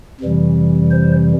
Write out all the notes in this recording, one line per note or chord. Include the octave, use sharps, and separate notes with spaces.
F2 C3 E3 G3
C5